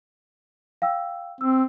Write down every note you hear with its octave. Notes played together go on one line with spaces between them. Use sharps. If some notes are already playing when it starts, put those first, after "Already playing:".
F5 G5 E6
C4 E6